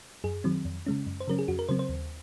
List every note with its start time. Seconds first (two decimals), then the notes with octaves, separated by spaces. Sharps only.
0.24 F#2 G#4
0.44 D#3 F#3 C4
0.65 F2
0.86 C#3 G#3 C#4
1.06 F#2
1.20 C5
1.27 C#3 F#3 C#4 A#4
1.39 G#4
1.48 F2 F#4
1.59 A#4
1.69 C#3 F#3 C4 C5
1.79 C5
1.89 D#2